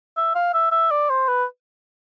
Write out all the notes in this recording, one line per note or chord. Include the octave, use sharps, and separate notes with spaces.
E5
F5
E5
E5
D5
C5
B4